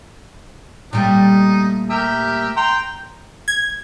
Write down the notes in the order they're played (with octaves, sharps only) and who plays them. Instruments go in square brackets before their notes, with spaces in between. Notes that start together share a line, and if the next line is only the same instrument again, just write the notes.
[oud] A#2 G3 A3 [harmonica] D#4
[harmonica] G4 A#4 E5
G5 A#5 C6
[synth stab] G#6